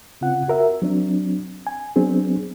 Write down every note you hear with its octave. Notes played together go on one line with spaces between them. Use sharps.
C#3 C4 F4 F#5
F#4 A#4 E5
F#3 C4 D4
G#5
F#3 B3 C4 D4 G#4